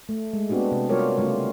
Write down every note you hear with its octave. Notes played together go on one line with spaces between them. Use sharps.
A3
G#3
B3 C4 D4 F#4 G4
C3
G3 F4 F#4 A#4 C#5 D5
C#3 G3 A3 C#4 F4